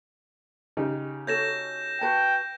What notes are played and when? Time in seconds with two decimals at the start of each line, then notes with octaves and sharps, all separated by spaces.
0.77 C#3 D#4 G4
1.27 F#4 A4 C#5 G6 A#6 E7
2.01 F#4 B4 G5 A5